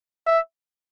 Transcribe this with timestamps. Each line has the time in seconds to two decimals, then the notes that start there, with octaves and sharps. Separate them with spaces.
0.27 E5